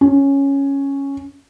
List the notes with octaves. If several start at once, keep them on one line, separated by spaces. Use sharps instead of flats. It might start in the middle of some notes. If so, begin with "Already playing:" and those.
C#4